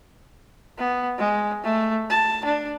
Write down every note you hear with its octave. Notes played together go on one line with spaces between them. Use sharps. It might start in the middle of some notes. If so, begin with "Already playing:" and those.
B3
G#3
A3
A5
D4